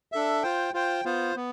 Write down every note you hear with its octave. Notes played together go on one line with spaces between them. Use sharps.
D4 A4 E5
F4 C5 G5
F4 C5 G5
B3 F4 C5
B3